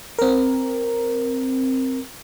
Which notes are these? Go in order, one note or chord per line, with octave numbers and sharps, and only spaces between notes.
C4 A#4